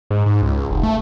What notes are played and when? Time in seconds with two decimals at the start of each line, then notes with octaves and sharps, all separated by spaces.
0.10 G#2
0.26 G#2
0.42 C#2
0.56 C#2
0.71 F1
0.83 A3